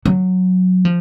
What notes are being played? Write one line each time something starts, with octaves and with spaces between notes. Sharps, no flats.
F#3
F3